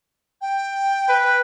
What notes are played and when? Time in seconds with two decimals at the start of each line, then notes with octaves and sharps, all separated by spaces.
0.41 G5
1.09 B4